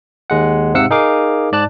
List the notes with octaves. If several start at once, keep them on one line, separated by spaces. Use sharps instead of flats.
D#2 G#3 F#5
G#2 C3 F5 F#5 E6 C#7
D#4 G#4 A#4 F5 D6
G#2 D5 A5 F#6